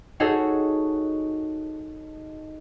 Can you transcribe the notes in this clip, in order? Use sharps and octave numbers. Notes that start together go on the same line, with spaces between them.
D#4 F#4 G#4 A4 C#5